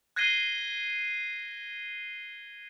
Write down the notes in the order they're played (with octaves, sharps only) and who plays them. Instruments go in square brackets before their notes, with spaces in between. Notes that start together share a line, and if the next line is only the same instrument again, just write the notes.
[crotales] F#6 G#6 A#6 C7 D#7 G7